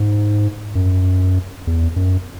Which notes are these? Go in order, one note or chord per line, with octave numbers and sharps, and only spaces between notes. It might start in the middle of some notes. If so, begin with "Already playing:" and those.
Already playing: G#2
F#2
E2
F#2